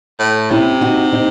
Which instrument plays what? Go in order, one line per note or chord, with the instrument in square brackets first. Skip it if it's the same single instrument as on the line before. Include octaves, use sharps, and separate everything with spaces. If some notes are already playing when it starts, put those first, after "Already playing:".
[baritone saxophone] A2
[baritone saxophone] C3 [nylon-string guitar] C#4 E4
[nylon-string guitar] D#4 F#4
C4 D#4